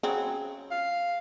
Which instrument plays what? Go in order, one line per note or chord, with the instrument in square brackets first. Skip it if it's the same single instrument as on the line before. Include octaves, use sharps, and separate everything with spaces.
[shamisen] C#3 F#3 C4
[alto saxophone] F5